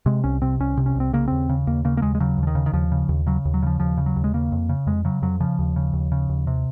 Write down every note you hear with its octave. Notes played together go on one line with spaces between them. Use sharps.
C3 G#3
C2 C#4
C3 C4
C2 C#4
C3
C#4
C2 C4
C#3 A#3
D#2 C4
C#3
D#2 A#3
C#3 A#3
A#3
D#2 G#3
G#3
C#3 F#3
D#2
F3
D#3
C#3
D#3
D#2 F3
C#3
D#2
C#3 F#3
D#2
F#3
C#3 F3
D#2 F3
C#3
F#3
D#2
G#3
C#3 A#3
F2
C#3
F2 G#3
C#3 F#3
F2 F#3
C#3 F3
D#2
C#3
D#2
C#3
D#2
C3